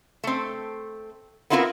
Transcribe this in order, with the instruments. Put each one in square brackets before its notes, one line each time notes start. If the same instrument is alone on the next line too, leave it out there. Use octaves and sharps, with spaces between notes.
[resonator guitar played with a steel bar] A3 C4
B3 C4 E4 F4 G4 A#4